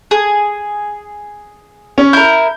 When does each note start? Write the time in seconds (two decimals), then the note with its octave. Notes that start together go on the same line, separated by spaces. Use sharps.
0.11 G#4
1.98 C#4
2.13 E4 A#4 G6